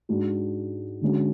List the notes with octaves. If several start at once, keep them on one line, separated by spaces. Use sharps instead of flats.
G#2 G#3 D4 F#4
D3 G#3 C#4 F#4